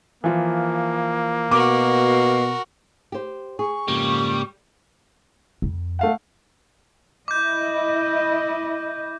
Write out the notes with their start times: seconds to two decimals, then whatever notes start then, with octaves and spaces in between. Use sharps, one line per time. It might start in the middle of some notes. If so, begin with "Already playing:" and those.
0.24 E3 F3 A#3
1.51 B2 F#4 A#4 D6
3.12 G4 C5
3.59 G#4 C#6
3.88 F2 G#2 C#3 G3 A#3
5.62 F2
5.99 A3 F5 F#5
7.28 E4 D#5 D6 G6